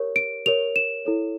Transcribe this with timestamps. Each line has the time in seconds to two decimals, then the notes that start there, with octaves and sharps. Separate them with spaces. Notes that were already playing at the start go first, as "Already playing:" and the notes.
Already playing: G4 A#4 C#5
0.16 D7
0.46 G4 A#4 C#5 F7
0.76 E7
1.05 E4 A4 C#5